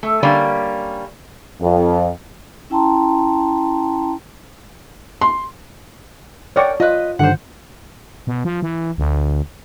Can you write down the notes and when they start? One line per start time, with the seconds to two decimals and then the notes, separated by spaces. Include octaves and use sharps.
0.03 A3
0.23 D3 G3 A#3 C#4 D5
1.61 F2
2.70 C#4 E4 G5 A5 A#5 C6
5.21 C6
6.56 A#4 C#5 D5 F#5 G5 C#6
6.80 F4 B4 D#5
7.19 G2 D3 D#3 C5 F#5
8.27 B2
8.45 F3
8.62 E3
8.98 D2